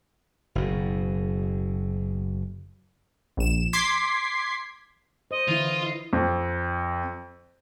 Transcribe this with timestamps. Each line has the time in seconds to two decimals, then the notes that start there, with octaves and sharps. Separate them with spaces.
0.55 F#1 B2
3.37 A#1 E7
3.73 C6 D6 G#6 B6 C7
5.31 C5 D#5
5.48 D3 E3 E4 F4
6.13 F2